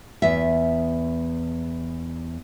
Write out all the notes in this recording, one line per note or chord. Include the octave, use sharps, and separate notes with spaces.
E2 E5